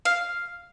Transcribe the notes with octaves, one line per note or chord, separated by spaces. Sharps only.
F5